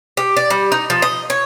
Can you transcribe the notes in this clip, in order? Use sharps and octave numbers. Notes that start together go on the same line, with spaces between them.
G4
D5
G3
D#4
F3
D#5
C#5